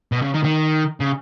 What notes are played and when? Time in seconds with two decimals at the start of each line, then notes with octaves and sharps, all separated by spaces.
0.12 B2
0.22 C#3
0.34 D#3
0.44 D#3
1.00 C#3